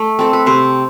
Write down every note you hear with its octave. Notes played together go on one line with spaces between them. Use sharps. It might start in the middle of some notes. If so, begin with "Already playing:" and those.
Already playing: A3
C4 A4
B4
C3 C5